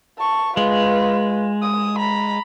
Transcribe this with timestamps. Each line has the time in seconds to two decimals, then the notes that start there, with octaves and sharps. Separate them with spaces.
0.18 A5 C#6
0.57 G#3 F4 B4
1.62 D#6
1.99 A#5 B5